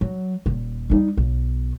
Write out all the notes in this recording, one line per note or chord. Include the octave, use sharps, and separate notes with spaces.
F#3
D#1 G#1
G3 D#4
B1